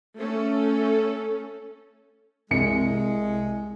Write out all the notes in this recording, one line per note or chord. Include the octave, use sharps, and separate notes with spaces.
A3 C#4 A4
C2 G#3 C#7